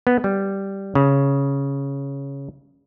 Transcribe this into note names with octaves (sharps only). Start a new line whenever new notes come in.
B3
G3
C#3